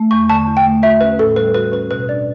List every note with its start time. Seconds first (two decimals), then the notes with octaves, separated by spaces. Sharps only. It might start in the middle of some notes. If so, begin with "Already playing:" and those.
Already playing: A3
0.11 E2 C#6
0.30 D3 A5
0.47 E2
0.57 G5
0.66 A3
0.82 F#4 E5
1.01 C#4 B4
1.19 A2 A4
1.36 G3 B4
1.54 F#4 B4
1.72 C#4 B4
1.91 B2 B4
2.09 D4 D5